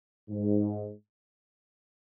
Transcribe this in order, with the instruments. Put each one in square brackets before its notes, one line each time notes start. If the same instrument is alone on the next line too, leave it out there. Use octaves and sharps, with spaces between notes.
[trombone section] G#2